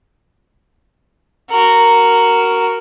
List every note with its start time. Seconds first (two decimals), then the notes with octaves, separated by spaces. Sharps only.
1.51 F#4 A#4